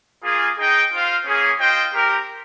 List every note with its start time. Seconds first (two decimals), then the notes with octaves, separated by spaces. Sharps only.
0.23 A#3 F4 G#4
0.57 D#4 G#4 D#5 G5
0.91 F4 C5 F5
1.25 A#3 C#4 G#4
1.58 F4 C5 D#5 G5
1.92 C4 G4 A#4